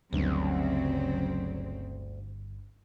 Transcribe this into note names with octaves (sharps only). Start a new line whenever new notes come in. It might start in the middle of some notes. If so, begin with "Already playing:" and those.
G1 D2 G2 C#3 F#3 C4